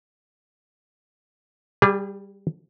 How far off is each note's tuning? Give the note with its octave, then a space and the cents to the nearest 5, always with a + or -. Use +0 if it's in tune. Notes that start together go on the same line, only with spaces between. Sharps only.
G3 +0 G#4 -35